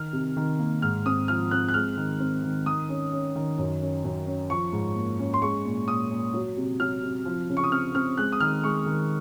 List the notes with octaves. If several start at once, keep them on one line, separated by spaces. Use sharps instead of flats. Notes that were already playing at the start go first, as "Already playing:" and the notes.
Already playing: D#3 F6
C3
D#3
A#3
G#2 F6
C4 D#6
F3 F6
C4 F#6
F#6
G#3 F6
D#3
C4
D#3
D#3 D#6
C#4
C#4
D#3
F#2
C#4
F#2
C#4
F3 C#6
G#2
A#3
C#4
C6
G#3 C#6
A#2
A#2 D#6
A#2
F#3
C3
F#3 F6
C3
F3
C#3
C#6
D#6
C4 F6
C4 F6
G#3 F#6
D#6
D#3 F6
G#3 C#6
D#3